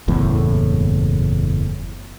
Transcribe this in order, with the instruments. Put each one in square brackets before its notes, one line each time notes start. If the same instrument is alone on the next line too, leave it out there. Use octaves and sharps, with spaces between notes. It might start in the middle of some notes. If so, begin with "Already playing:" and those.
[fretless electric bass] F#1 E2 A2